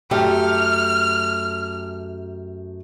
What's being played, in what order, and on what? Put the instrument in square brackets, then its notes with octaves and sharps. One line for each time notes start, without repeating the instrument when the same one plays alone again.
[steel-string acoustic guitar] F#2 A3 G4 [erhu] F6